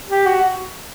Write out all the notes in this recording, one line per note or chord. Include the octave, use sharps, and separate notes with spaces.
G4
F#4